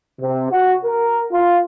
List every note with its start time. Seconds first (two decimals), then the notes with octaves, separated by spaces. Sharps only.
0.20 C3
0.51 F#4
0.84 A#4
1.31 F4